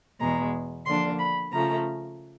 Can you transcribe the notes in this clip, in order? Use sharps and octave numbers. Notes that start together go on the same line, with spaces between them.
E2 B2 G#3 A#5
D3 F3 A#3 D4 C6
B5
C#3 F3 A3 A#5